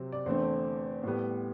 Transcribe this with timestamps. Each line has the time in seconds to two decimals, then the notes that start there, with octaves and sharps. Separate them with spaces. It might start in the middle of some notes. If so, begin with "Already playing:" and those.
Already playing: C3 F#3 C4
0.12 D5
0.26 E2 D3 A3 C4 C5
1.04 A2 G3 B3